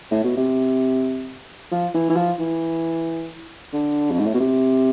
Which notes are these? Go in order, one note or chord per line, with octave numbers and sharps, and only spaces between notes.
A2
B2
C3
F3
E3
E3
F3
E3
D3
F2
G#2
A2
B2
C3